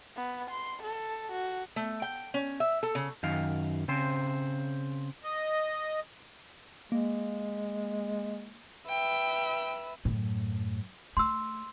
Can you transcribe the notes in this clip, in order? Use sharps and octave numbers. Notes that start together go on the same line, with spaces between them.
B3
C6
A4
F#4
A3
G5
C#4
E5
A4
C#3
F#2 D#3 F5
C#3 C4 C5
D#5
G#3 A#3
B4 E5 G5
F#2 A2
A3 C6 E6